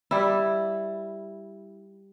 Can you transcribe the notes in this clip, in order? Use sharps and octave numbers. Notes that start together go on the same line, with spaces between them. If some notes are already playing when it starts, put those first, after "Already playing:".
G3 E4